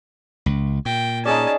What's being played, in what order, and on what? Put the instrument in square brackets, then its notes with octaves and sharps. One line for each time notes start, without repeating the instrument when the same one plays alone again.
[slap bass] C#2
[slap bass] A#2 [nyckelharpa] G5
[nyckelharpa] C#4 A5 [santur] D#4 G#4 D5